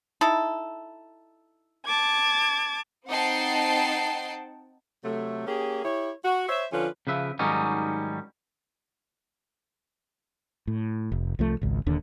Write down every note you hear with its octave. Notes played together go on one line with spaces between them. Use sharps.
D#4 E4 A4
A5 D6 G#6
C4 D#4 F#5 G5 A5 C7
C3 F#3 A3
A#3 C#4 G4 G#4
E4 G4 C#5
F#4
C5 C#5 E5
D3 F3 C#4 F4 B4
C#3 F3 B4 E5
G#2 D#3 F#3 G3 C#4 D#4
A2
F1
C2 F3 A3
G#1 C#2
D#1 D#2 D3 D4